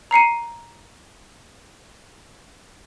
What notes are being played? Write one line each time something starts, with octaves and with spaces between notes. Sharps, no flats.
A#5 C7 C#7 D#7